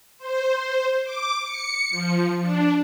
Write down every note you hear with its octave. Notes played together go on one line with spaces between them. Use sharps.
C5
D6
C#7
F3
D4